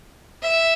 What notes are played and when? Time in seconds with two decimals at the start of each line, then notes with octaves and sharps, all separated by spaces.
0.42 E5